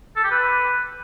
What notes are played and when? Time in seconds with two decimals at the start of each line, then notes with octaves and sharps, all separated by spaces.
0.16 A4
0.24 G4
0.31 B4